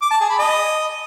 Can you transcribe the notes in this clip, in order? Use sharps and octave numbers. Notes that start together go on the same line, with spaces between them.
D6
A5
G#4
B5
D#5